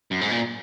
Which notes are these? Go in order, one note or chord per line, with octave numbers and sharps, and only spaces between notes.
F#2
G#2
A#2